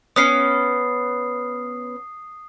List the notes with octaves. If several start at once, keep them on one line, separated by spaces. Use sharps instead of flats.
B3 C#4 D#6 C7